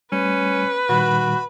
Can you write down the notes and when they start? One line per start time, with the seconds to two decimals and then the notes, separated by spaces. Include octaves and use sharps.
0.12 G3 A3 C#4 B4
0.89 A#2 D#3 G3 F#4 B5